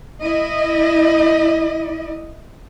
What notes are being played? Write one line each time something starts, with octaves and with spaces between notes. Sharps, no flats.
E4 D#5